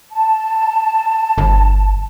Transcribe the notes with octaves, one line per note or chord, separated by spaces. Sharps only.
A5
G1